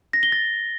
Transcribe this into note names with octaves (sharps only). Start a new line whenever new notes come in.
A#6
G7
A6